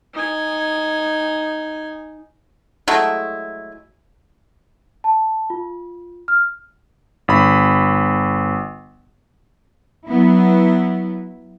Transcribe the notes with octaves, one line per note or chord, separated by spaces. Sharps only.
D#4 G#5
F#3 G#3 A3 E4
A5
F4
F6
G1 B5
F#3 B3 E4